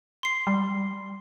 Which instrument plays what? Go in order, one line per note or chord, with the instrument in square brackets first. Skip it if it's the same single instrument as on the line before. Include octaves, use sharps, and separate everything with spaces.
[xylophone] C6 C7
[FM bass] G3